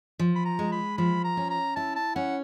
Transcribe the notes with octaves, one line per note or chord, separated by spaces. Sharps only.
F3
B5
A#5
G#3
B5
F3 B5
A#5
C#4
A#5
E4 A5
A5
C#4 F#5